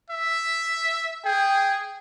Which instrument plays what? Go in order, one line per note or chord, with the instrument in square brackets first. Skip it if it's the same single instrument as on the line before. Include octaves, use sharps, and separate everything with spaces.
[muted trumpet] E5
[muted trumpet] G#4 [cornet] G5